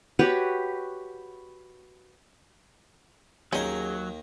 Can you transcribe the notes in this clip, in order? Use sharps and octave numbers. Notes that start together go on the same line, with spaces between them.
F#4 G4 B4 C#5
D#2 F#3 C#4 D#4 G#4 A#4